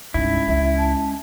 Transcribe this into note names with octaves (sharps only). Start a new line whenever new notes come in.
C2 G2 G#3 C#4 D#4 E4
C#2 E5
A5